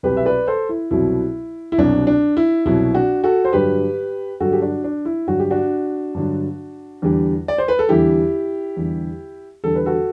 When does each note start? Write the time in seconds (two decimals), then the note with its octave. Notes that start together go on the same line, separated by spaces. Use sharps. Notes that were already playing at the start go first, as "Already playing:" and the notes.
0.03 C2 B2 F#3 G4 B4
0.17 E5
0.25 B4 D5
0.47 A4 C5
0.69 E4
0.91 C2 B2 F#3 E4
1.72 E4
1.78 C2 B2 F#3 D4
2.07 D4
2.37 E4
2.65 C2 B2 F#3 E4
2.95 D4 F#4
3.24 F#4 A4
3.45 C5
3.53 G2 D3 F#3 G4 B4
4.40 G2 D3 F#3 F#4 A4
4.52 G4
4.62 D4 F#4
4.84 D4
5.05 E4
5.27 G2 D3 F#3 F#4
5.39 G4
5.51 D4 F#4
6.15 G2 D3 F#3
7.02 E2 D3 G3
7.48 D5
7.58 C5
7.68 B4
7.79 A4
7.89 E2 D3 G3 E4 G4
8.77 E2 D3 G3
9.64 E2 D3 G3 A4
9.76 B4
9.86 F#4 A4